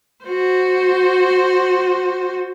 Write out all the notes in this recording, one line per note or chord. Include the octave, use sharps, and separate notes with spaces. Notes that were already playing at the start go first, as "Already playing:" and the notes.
F#4 C5